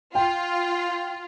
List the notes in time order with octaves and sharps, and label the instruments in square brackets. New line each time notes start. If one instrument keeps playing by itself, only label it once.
[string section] F4 [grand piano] G5